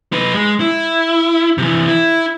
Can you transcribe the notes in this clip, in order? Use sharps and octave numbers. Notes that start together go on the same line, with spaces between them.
D#4 B4
G#3
E4
C3 E3
E4